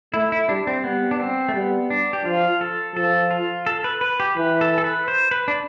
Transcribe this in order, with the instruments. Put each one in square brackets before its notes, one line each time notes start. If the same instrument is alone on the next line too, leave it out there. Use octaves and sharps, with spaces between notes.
[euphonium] A3 [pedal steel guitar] E4
[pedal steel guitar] E4
[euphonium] G3 [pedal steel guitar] D4
[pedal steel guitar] C4
[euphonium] G3 [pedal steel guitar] B3
[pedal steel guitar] D4
C4
A3
[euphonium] G3 [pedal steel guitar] B3
[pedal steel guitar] D4
G4
[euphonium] F3 [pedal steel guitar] F4
[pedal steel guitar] A4
[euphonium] F3 [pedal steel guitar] A4
[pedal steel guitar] F4
A4
B4
B4
G4
[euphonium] E3 [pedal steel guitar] B4
[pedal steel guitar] A4
A4
B4
C5
B4
D4